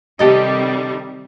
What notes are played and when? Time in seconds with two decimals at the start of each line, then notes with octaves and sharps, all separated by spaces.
0.19 C3 D#3 G3 G4 A4 D#5